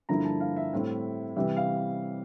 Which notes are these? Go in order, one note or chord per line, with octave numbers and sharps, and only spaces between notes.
G2 D3 F3 A#3 E4 A#5
A5
F5
E5
A2 G3 C4 E4
C3 E3 G3 E5
F5